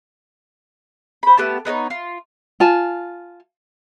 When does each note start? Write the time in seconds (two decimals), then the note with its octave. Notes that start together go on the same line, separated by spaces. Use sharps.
1.23 C5 B5
1.37 A3 B3 G4 A5
1.65 B3 D#4 A4 C#5
1.90 F4
2.60 F4 G#5 A5